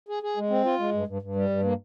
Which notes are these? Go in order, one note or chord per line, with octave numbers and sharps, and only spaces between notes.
G#4
G#4
G#3
C4
F4
G#3
G2
G2
G2
G3
G2
A#3